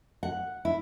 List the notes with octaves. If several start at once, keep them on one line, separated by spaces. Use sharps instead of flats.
F#5
E4